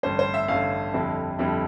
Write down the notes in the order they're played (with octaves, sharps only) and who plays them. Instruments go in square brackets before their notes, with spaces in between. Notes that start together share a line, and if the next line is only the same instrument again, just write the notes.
[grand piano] A1 G2 D3 C5
C5
E5
A1 G2 D3 F5
F2 D3 G3 C4 E4
F2 D3 G3 C4 E4